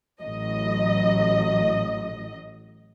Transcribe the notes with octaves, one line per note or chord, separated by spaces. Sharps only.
A1 F#3 D#5